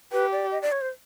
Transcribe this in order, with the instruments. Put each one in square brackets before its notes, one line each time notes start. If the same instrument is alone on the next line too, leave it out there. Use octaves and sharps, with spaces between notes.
[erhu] G4 [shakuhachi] B4
[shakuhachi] D5
D#5
D5
C#5
C5